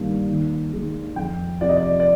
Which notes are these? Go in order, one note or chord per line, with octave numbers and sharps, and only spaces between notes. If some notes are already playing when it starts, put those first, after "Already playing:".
Already playing: G2 D#3 G3 A#3
D#2
D#3 G#3
F2 G5
C3 F3 D5
D#5
D5
D5